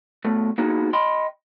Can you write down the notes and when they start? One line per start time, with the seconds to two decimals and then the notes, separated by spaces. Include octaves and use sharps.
0.25 B2 A3
0.58 A#3 B3 D#4 F4 F#4 G#4
0.93 D#5 G5 B5 C6